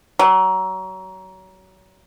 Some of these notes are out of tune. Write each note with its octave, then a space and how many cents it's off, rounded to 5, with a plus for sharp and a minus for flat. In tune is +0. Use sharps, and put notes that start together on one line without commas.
F#3 +30